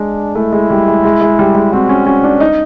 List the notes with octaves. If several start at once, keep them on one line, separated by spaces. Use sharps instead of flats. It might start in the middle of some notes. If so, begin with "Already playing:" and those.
Already playing: G#3 D4
A3 E4
G#3
G3
G#3
G#3
G#3
G3
G#3
C4 F#4
C#4
C#4 F#4
D4
D#4